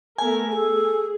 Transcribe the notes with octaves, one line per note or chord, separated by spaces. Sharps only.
A3 B3 A#4 G#5
G#4 A4